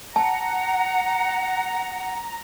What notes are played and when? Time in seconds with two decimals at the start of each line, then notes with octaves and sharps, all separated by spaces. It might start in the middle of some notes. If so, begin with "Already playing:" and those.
0.16 F#5 A5 A#5